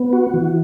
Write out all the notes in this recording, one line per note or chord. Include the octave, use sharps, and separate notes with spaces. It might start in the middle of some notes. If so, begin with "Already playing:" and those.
Already playing: B3
F#4
E3